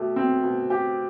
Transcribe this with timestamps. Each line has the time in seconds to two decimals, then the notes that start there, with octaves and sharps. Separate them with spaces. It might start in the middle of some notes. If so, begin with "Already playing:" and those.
Already playing: B2 A3 G4
0.16 C4
0.43 B2
0.70 G4